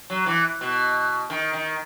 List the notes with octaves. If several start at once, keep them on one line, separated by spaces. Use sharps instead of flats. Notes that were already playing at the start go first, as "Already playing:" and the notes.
F#3
E3
B2
D#3
D#3